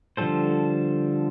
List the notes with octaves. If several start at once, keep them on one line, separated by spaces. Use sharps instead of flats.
D3 F3 G3 A4 C5